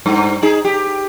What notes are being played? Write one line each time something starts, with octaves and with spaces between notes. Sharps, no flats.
G2
D#4 G#4
G4